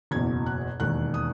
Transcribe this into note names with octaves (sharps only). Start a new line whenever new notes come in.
F#1 E2 B2 G#6
F#6
E1 D#2 D#3 F#6
D#6